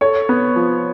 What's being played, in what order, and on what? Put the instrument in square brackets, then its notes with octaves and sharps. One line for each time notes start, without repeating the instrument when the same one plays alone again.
[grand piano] A4 [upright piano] C#5
[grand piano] B3
F3